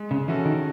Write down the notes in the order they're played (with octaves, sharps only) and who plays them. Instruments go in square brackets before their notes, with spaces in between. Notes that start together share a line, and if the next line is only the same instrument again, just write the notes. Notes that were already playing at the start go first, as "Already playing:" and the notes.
Already playing: [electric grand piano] G#3
[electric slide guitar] C#3
[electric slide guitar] E3 [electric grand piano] C#4 F#4 A4
[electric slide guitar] D#3